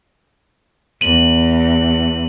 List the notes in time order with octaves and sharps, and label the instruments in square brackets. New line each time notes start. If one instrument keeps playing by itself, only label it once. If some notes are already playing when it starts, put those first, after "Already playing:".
[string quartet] E2 [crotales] D#7 F#7